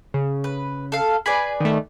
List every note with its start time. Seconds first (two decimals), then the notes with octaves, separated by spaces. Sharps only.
0.14 C#3
0.44 B4
0.92 A4 F5
1.26 G#4 B4 D5 G#5 B5
1.60 D#3 A3